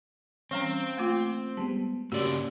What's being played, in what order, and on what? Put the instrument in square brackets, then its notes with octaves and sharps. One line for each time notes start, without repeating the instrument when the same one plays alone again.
[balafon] E3 G3 C#4 [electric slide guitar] C4
[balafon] A3 A#3 F4
[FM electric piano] G3 G#3 B3 [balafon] A5
[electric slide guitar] G2 C#3 D5 [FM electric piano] A#3 C#4 F#4 [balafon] G4